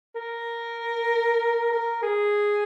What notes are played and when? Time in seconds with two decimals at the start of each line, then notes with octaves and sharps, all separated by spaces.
0.15 A#4
1.72 A#4
2.03 G#4